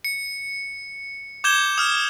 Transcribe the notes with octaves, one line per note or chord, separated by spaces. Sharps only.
C#7
D6 G6 G#6 E7 G7
D#6 F6